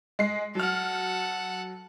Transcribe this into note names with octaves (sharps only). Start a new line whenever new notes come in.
G#3 C7
F#3 A4 F#5 F6